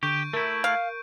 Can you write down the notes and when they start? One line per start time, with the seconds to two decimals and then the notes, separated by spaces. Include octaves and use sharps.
0.03 D3 G4 C#6 G6 D7
0.34 A3 E4 A#4
0.64 F5